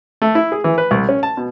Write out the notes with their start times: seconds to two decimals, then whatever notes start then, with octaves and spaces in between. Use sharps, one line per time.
0.22 A3
0.35 E4
0.52 G#4
0.64 E3
0.78 B4
0.91 C2
1.09 C#4
1.23 A5
1.37 B2